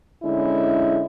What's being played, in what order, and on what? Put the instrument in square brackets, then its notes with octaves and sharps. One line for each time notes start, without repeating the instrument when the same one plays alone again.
[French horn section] D3 G#3 C#4 E4